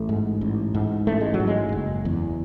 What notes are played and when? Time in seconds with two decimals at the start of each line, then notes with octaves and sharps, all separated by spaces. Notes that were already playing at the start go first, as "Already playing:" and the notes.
Already playing: A1 A3
0.09 G#2
0.41 A1
0.74 G#2
1.07 A1 A3
1.21 G#3
1.34 F#3
1.40 G#2
1.47 G#3
1.72 F#1
2.05 E2